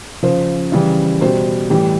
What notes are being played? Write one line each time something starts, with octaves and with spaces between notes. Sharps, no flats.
C#3 F3 C5
C#3 E3 G3
B2 G3 C5
A2 E3 G3 G4